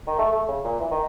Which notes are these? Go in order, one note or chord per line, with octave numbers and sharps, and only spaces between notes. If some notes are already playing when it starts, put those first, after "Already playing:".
D#3
A3
A3
C#3
A#2
E3
D#3